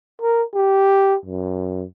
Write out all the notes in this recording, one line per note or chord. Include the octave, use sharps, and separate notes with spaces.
A#4
G4
F#2